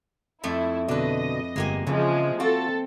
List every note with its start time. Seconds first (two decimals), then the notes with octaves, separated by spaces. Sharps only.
0.44 F2 A3 E4
0.88 B2 D3 D4 B4 D#5
1.56 G1 G#3 A#3 G4 G#5
1.87 C#3 E3 F3 G#3
2.40 C4 F4 F#4 A4 A6